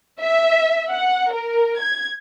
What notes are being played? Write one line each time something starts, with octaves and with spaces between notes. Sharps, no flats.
E5
F#5
A#4
G#6